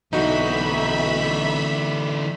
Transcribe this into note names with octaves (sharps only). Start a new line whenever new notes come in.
B1 D3 E3 D#4 F#4 E5 B5